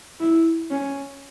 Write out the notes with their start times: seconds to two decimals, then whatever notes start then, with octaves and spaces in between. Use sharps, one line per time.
0.20 E4
0.71 C#4